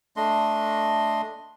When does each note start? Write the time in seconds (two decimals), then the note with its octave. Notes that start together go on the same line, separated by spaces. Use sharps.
0.16 A3 D4 D#5 C6